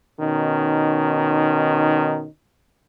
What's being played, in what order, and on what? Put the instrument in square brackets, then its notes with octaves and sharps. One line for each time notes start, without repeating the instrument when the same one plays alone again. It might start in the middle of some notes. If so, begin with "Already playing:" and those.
[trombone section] B2 D#3 C#4 D#4